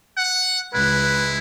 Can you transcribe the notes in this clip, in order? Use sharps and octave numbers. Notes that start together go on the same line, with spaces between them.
F#5
C#2 G#3 E4 B4